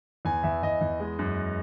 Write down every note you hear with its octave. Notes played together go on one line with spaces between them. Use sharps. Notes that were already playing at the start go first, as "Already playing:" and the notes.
E2 G#5
E2 E5
E2 D#5
E2
G#3
F#2